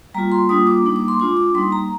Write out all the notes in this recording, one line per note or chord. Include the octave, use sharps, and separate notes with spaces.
G3 A#3 F4 A#5
C6
G3 A#3 D4 F4 D#6
D6
G3 A#3 D#4
D6
C6
G#3 D4 F4 D6
D6
G3 A#3 D#4 C6
A#5